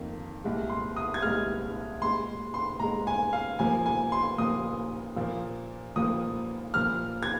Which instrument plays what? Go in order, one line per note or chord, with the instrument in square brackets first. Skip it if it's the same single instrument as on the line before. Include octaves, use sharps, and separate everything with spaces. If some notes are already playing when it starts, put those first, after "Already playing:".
Already playing: [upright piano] F2 D#3 A#3
C2 A#2 G#3
C6
D#6
G#6
C2 A#2 G#3 F6
A#2 G#3 C6
C6
A#2 G#3 A#5
G#5
F5
A#2 F3 A#3 G#5
G#5
C6
A#2 F3 A#3 D#6
A#2 F3 A#3
A#2 F3 A#3 D#6
A#2 F3 A#3 F6
G#6